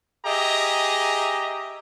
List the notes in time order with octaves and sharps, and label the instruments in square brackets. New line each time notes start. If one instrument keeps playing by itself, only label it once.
[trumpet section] G4 G#4 D#5 E5 A#5